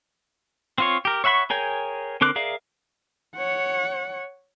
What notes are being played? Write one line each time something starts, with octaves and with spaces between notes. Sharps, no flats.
C4 F4 C#5
G4 A#4
C#5 E5 F#5 B5 C#6
G#4 A#4 C#5 G5 G#5
D3 C4 A#4 D6 F#6
G#4 A#4 D5 E5 F5
C#5 F#5